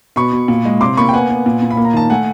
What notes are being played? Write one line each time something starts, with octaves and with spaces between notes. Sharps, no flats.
B2 B5 C#6
B2
A#2
G#3
C3 C6 D6
A#3 B5 C#6
G5
B3 F#5 G#5
B3
A#2
A#2
B5
A#3
A#5
D#3 A5
A3 F#5 G#5